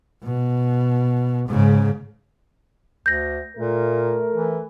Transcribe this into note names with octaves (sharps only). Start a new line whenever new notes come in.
B2
G#2 C#3
D2 G6 A#6
A#2 A3 A#4
E3